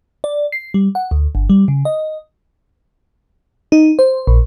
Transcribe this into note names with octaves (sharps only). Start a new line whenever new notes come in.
D5
C7
G3
F#5
D2
G1
G3
C#3
D#5
D#4
C5
A#1